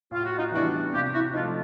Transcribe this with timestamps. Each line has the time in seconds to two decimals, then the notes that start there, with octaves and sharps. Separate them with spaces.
0.11 A2 F4
0.23 F#4
0.37 D#4 F4
0.51 E3 G3 B3 D4 E4 F#4
0.93 C3 F4 G4
1.13 E4 F#4
1.33 F3 D#4 F4
1.37 A3